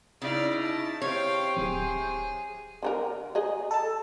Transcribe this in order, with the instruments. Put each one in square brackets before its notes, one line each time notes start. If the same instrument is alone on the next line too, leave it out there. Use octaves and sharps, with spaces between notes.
[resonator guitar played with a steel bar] C#3 [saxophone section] D#4 E4 [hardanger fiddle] D5 F5
[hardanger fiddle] A5
[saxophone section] C3 C5 [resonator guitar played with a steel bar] C#5 [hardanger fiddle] F5 G5
[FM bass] D1 [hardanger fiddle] G#4
[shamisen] D3 D#4 A#4
G#4 D#5
[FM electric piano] A4 A5